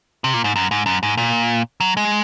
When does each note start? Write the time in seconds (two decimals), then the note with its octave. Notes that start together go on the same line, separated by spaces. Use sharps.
0.24 C3
0.34 A#2
0.44 G#2
0.56 F#2
0.71 G#2
0.86 F#2
1.03 G#2
1.17 A#2
1.80 F#3
1.97 G#3